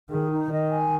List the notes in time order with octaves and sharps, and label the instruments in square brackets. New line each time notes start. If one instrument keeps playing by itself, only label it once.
[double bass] D#3 [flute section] G#4
[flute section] D#4
[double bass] D#3 [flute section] D#5
[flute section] G#5